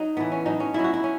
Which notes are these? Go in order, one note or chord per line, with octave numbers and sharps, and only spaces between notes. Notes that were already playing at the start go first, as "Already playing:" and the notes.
Already playing: F#3 D#4
A2 E3 B3
C#4
A2 F#3 D#4
C#4
B2 F#3 E4
F#4
E4
C#4